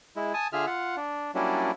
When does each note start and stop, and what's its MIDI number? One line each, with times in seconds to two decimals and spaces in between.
0.16 0.33 56
0.16 0.33 64
0.34 0.47 80
0.34 0.47 81
0.34 0.47 87
0.53 0.66 50
0.53 0.66 65
0.53 0.66 68
0.53 0.66 76
0.53 0.66 89
0.67 0.96 65
0.67 0.96 78
0.97 1.31 62
1.35 1.71 54
1.35 1.71 55
1.35 1.71 58
1.35 1.71 61
1.35 1.71 62
1.35 1.71 64